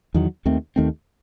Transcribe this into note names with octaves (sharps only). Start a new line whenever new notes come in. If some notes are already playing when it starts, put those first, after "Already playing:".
E2 D#3 F#3
D#2 D#3 A3 C4
D#2 D#3 A3 C4